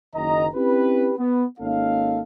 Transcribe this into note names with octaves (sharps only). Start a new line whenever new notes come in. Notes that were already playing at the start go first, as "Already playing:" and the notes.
F#1 D#3 D#5 A#5
C4 C#4 E4 G4 B4
B3
G#1 A#3 C#4 D#4 A4 F5